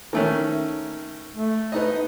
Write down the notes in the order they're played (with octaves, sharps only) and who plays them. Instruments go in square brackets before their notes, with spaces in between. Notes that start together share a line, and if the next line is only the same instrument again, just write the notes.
[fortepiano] D#3 A3 C#4
[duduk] A3
[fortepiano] B3 D#4 D#5